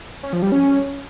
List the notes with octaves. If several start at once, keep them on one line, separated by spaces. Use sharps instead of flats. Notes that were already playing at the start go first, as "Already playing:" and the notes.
C#4
F3
G3
C#4